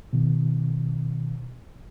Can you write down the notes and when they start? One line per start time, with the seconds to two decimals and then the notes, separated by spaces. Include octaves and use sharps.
0.13 B2 D#3